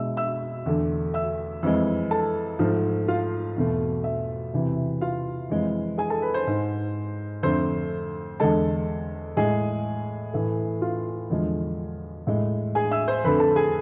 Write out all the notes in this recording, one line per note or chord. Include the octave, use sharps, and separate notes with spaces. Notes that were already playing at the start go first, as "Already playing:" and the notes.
Already playing: B2 G#3 E5 E6
E5 E6
E2 D3 A3
E5 E6
F2 E3 G#3
A4 A5
G#2 F3 A3
F4 F5
E2 B2 A3
E5
E2 C3 E3
F4 F5
F2 E3 G#3
G#4 G#5
A4 A5
B4 B5
C5 C6
G#2 G#3
F2 D3 A3 C5 C6
E2 D3 G#3 A4 A5
A2 G#3 G#4 G#5
A2 E3 A3
F4 F5
E2 D3 F3 G#3
A2 G#3
G#4 G#5
E5 E6
C5 C6
F2 D3 A3 B4 B5
A4 A5
G#4 G#5